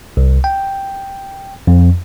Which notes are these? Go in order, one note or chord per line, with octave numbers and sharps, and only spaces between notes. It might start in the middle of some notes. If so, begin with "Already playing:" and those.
C2
G5
F2